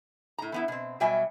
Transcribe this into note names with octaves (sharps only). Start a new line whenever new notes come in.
A2 A#5
E3 B3 E4
B2 C4
B2 F#3 G3 E5 G5 G#5